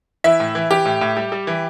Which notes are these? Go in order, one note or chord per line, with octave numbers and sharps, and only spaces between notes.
E3 E4 E5
A2
E3
E3 G4
A2
A2
G3
G3
E3